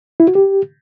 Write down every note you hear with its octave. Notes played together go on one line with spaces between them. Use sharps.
E4
F#4
G4